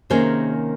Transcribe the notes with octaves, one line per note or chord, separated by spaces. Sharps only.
C3 D#3 A#3 C#4 G#4 C5